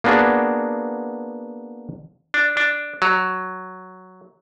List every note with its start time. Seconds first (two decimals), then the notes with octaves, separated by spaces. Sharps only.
0.04 A#3 B3 D4 F#4 G#4
2.34 D4
2.57 D4
3.02 F#3